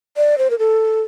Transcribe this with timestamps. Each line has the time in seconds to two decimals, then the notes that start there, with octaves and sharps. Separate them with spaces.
0.17 D5
0.38 C5
0.50 A#4
0.59 A4